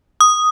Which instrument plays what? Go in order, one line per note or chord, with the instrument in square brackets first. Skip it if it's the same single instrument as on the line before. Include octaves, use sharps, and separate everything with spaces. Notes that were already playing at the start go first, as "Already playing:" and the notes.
[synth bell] D#6